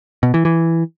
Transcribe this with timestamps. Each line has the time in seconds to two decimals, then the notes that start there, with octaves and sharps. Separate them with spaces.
0.23 B2
0.34 E3
0.45 E3